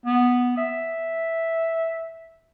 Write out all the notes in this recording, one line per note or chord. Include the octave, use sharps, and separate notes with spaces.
B3
E5